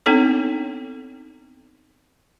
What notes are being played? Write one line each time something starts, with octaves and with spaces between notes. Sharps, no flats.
B3 C4 D4 D#4 A4 C#5